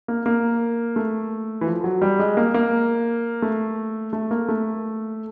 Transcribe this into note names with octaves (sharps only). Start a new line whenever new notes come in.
A#3
A#3
A3
E3
F3
F#3
G3
G#3
A#3
A#3
A3
A3
A#3
A3